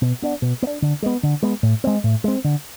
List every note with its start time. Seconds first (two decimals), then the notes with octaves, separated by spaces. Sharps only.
0.02 B2
0.22 B3 D4
0.42 B2
0.63 B3
0.67 D4
0.82 D3
1.02 G#3 B3
1.23 D3
1.43 G#3 B3
1.63 A2
1.84 G#3 C4
2.04 A2
2.24 G#3 C4
2.44 D3